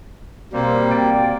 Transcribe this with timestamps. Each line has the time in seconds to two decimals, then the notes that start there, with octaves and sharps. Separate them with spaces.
0.53 B2 G3 A#3 C4
0.92 D5 G5